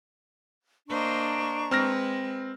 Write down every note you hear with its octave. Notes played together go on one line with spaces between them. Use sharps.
A#3 D4 C5 D#5 A#5 C#6
G#3 C4 B4 F6 A#6